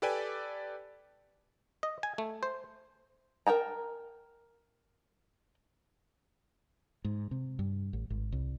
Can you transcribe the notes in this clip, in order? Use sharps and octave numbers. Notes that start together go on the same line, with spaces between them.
G4 A4 B4 D5 G5 G#5
D#5
G#5
A3
C5
A#4 G5 A5 A#5
G#2
C3
G2
A1
G#1
C2